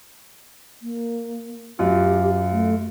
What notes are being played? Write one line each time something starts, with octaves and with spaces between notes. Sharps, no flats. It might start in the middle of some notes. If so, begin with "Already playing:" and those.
A#3
F#2 F4 G4
A3